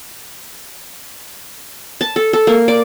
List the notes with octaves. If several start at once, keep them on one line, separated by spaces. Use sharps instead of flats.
A5
A4
A4
A#3
D5